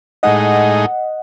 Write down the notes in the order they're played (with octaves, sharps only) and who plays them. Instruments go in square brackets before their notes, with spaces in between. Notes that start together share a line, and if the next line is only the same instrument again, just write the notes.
[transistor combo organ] A2 G#3 D#4 [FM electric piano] D#5 F#5